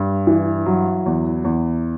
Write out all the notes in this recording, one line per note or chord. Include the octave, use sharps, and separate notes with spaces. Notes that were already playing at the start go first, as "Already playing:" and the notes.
Already playing: G2
E3
F#3
E2
E2